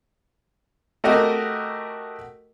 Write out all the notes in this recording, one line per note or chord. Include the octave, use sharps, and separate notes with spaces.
A3 F#4 G4 A#4 D#5